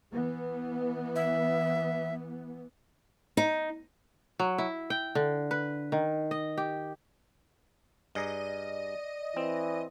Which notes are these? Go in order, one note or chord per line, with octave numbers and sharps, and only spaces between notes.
E3 B3
E5
D#4
F#3
E4
G5
D3
B4
D#3
D#5
G4
G2 G#4 D5 D#5 A#5
E3 C4